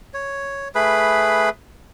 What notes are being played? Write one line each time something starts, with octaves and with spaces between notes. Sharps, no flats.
C#5
A3 G#4 B4 B5